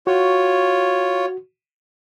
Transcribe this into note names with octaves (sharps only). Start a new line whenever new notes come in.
F4 F#4 C#5